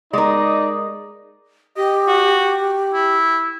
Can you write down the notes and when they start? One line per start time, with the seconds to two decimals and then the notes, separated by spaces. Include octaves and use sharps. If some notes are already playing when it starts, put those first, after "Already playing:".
0.13 G#3 D#4 A#4 D5
1.77 G4 D#5
2.07 F#4
2.94 E4